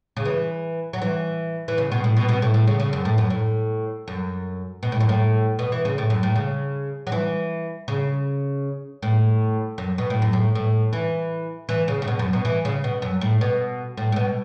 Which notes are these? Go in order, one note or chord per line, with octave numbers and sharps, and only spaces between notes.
C#3
E3
F#3
E3
E3
C#3
B2
A2
B2
B2
A2
A2
C#3
C#3
F#2
A2
F#2
A2
F#2
B2
A2
F#2
A2
B2
E3
C#3
A2
F#2
A2
C#3
F#3
E3
C#3
A2
F#2
B2
A2
F#2
A2
A2
E3
E3
C#3
C#3
B2
F#2
B2
E3
C#3
B2
F#2
A2
B2
A2
A2
B2